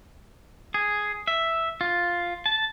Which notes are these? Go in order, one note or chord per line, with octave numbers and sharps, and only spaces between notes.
G#4
E5
F4
A5